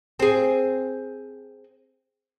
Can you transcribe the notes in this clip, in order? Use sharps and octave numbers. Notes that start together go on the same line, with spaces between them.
C4 G#4